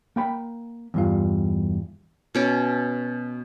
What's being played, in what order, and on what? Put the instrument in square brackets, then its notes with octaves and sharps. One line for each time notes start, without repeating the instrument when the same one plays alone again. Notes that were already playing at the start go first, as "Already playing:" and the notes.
[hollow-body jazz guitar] A#3 G5 B5
E2 G2 F4
[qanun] B2 C#4 D6